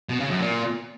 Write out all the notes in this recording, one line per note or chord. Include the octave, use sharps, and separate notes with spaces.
B2
C#3
F#2
A#2